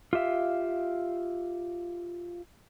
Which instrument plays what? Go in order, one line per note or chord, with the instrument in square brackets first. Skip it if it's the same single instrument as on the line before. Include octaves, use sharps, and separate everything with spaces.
[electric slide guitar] F4 G4 E5 F5